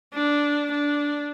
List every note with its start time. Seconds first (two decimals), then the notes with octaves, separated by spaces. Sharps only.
0.14 D4
0.71 D4